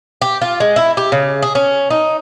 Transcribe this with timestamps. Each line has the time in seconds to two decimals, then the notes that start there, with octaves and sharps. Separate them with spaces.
0.22 G4
0.41 F4
0.60 G#3
0.76 E4
0.97 G4
1.12 C#3
1.42 G#4
1.55 C#4
1.90 D#4